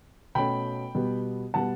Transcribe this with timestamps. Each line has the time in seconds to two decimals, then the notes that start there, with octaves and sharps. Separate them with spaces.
0.35 B2 A3 C#4 G5 B5
0.95 B2 G3 B3
1.54 B2 G3 B3 F#5 A5